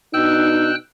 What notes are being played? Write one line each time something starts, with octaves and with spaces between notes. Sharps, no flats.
B2 D4 D#4 G5 E6 F#6